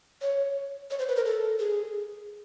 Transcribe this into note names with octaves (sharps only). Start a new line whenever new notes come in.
C#5
C#5
C5
B4
A#4
A4
G#4